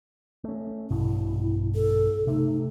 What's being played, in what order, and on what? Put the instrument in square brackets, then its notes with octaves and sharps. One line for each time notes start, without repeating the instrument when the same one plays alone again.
[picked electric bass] A3 C#4
[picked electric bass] A#1 G2 B2 [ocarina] E4
[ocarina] A4
[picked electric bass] C3 A3 [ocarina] D#4